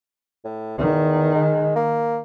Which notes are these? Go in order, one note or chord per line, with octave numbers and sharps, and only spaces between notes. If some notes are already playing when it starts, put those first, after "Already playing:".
A2
E2 D#3
G#3
A#3